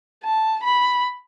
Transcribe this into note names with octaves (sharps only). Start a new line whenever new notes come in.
A5
B5